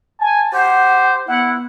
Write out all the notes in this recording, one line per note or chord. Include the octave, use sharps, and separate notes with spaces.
G#5 A5
G4 C5 F#5
B3 E4 F#5